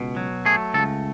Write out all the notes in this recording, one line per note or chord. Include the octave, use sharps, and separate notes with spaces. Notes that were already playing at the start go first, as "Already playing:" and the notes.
Already playing: C#2 B2
F#3
A3 G#4
C#2 A4